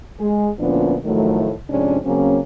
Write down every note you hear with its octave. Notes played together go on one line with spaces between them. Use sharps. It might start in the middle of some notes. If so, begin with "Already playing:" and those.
G#3 G#4
D2 A#2 F3 B3 C#4 D4
A2 D#3 F3 F#3 A3
F2 G#2 C3 C#4 D4
C#3 F#3 A#3 C4 C#4